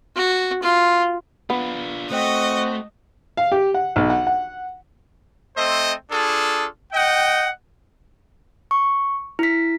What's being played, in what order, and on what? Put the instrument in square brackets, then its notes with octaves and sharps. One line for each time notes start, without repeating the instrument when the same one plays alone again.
[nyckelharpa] F#4
F4
[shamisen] B3 [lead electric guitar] D4 F4
[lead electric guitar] A3 [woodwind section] C4 F#4 [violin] D#5
[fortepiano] F5
G4
F#5
B1
F#5
F#5
[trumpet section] A3 C4 C5 D#5
D4 F4 G#4 A4
D#5 F#5 G5
[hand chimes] C#6
E4 B6